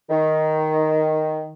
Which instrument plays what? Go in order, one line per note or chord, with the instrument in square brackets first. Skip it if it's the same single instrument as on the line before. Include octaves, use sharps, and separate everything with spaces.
[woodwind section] D#3